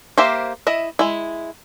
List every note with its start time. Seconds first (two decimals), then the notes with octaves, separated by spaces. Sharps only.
0.18 A#3 G4 C5 E5
0.67 E4 D#5 E5
0.99 G#3 E4